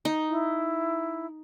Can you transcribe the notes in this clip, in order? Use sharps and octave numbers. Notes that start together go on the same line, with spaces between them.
D#4
E4